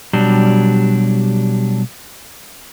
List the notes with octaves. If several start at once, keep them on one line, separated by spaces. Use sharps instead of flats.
B2 F#3 G3 D4 G4